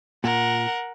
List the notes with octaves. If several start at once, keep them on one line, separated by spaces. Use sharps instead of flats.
A#2 A#4 F#5